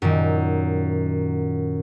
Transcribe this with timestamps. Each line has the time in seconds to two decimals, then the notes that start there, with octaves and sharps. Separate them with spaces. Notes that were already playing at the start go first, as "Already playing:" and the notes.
0.02 F#2 A#2 D#3